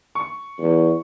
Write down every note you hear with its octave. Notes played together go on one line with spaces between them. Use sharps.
C#6
E2